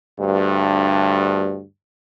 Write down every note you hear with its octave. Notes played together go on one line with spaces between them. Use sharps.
D2 G2